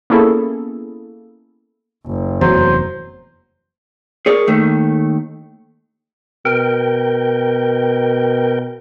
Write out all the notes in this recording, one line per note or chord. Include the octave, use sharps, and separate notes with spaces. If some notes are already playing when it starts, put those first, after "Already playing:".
A#3 B3 C#4 E4 G#4 A4
F#1
F1 E2 F#3 C5
G#4 A#4 C#5 D5
D#2 D#3 A3
B2 A#4 G5